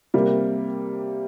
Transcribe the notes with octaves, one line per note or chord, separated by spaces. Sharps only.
C3 G3 A#3